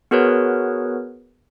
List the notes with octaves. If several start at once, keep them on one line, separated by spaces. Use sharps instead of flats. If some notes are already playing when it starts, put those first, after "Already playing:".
B3 F#4 G#4 A#4 B4 C#5